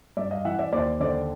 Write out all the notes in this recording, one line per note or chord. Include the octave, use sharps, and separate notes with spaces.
G2 D5 E5
D#5 F5
E3 E5 F#5
D5 E5
D#2 C5 D5
D3 C5 D5